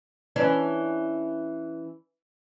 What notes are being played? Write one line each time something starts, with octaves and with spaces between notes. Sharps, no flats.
E3 C#4 D4